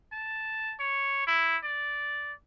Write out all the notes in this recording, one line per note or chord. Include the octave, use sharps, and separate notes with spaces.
A5
C#5
E4
D5